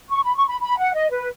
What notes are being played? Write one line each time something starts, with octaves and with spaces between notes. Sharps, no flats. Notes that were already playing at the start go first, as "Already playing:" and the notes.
C#6
B5
C#6
B5
B5
F#5
D#5
B4